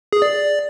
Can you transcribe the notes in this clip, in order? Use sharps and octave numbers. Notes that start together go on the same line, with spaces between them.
G#4
D5